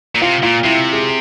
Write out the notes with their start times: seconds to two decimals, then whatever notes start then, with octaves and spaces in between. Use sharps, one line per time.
0.15 A#2
0.22 C3 F4
0.43 A#2 F4
0.64 C3 E4
0.93 G#4